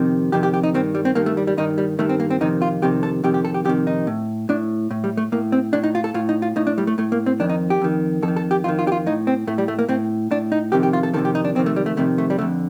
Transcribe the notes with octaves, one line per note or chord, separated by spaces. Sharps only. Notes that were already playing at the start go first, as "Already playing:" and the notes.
Already playing: F2 C3 D#3
F2 C3 D#3 G4
G4
G4
D#4
G2 D#3 C4
G3
C4
G2 D#3 A#3
A3
G3
G3
G2 D#3 D#4
G3
G2 D#3 A3
C4
A#3
C4
F2 C3 D#3 D#4
F4
F2 C3 D#3 G4
A4
F2 C3 D#3 G4
G4
A4
G4
F2 C3 D#3 G4
D#4
A2
A2 D4
A2
G3
A3
A2 A#3
C4
A2 D4
D#4
F4
A4
A2 F4
D#4
F4
A2 D#4
D4
G3
A3
A2 A3
A#3
C4
F2 D#3 D4
D#4
G4
F2 D#3
F2 A4
D#3
A4
G4
F2 D#3 F4
F4
G4
F4
A2 D#4
C4
A2 A3
G3
A3
A#3
A2 C4
A2 D4
D#4
F2 C3 D#3 G4
G4
F4
A4
F2 C3 D#3 A4
G4
D#4
D4
F2 C3 D#3 C4
A3
G3
A3
F2 C3 D#3 A3
A3
G3
F2 D3 A3